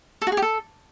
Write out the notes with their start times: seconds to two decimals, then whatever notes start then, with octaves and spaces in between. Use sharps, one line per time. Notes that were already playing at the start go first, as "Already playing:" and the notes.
0.22 A4
0.27 F#4
0.32 G#4
0.37 G4
0.42 A4